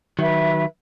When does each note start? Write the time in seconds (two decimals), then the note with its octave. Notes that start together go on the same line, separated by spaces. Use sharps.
0.19 D#3 F#3 B4 E5